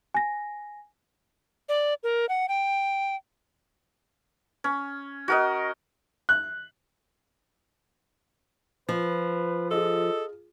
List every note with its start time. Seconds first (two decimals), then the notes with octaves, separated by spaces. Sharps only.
0.15 G#5 A#6
1.69 D5
2.03 A#4
2.29 F#5
2.49 G5
4.64 C#4
5.28 F#4 A#4 D#5
6.29 F#6
8.89 F3 B4
9.71 F4 G#4 A4 D#5